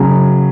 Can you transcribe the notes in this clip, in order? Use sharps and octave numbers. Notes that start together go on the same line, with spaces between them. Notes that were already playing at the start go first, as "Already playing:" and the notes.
Already playing: C#3 F#3 C#4